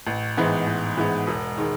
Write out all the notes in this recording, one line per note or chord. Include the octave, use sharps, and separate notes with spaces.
A1
G#2 E3 G#3 B3
A1
G#2 E3 G#3 B3
E1
D#3 G#3